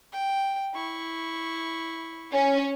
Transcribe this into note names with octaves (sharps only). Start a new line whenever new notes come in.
G5
E4 C#6
C#4